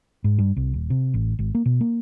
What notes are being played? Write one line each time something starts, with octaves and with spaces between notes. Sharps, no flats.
G#2
G2
C2
D#1
C3
A1
G#1
A#3
B2
A#3